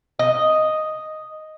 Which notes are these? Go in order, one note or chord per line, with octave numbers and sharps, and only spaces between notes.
D#5